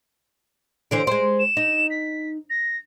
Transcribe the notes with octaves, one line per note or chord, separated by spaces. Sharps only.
D3 E3 C5 D7
G#3 C5
E7
D#4
B6
A#6